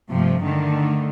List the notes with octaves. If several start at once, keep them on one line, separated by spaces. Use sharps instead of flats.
G2 C3 F3 A3
D3 D#3 A3